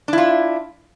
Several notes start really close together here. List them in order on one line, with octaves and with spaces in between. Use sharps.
D4 E4 F4